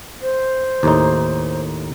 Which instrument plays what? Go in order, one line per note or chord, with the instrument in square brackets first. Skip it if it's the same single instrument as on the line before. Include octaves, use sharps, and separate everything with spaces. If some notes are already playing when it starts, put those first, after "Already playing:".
[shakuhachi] C5
[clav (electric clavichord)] D#2 A2 D#4